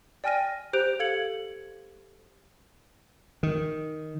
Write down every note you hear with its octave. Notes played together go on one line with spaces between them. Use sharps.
D5 G5 G#5 F6 A#6 D#7
G4 C5 F#6 G6 D7 F7
A4 F5 G#6 C#7 F#7
D#3